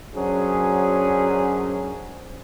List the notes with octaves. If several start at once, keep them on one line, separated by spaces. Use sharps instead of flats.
F#2 F#3 C#4 D4 G#4 C5